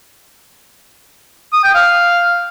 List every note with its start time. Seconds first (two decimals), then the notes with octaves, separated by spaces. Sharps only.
1.53 D#6
1.64 G5
1.75 F5